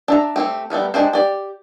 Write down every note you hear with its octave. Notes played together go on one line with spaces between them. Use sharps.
D4 E5 A#5
A3 C4 G4
G3 A3 B3 A#4
G#3 D4 G4 C5
G4 D5